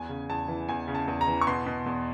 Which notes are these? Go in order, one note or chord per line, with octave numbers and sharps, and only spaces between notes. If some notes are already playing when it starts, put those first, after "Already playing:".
Already playing: E2 G#5
C#3
E2 A5
E3
E2 G#5
C#3
A5
E2
A#5
E3
C#6
B2 C6
B2
E2